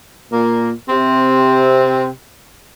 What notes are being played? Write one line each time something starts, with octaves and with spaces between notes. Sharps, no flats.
A#2 A#3
C3 C4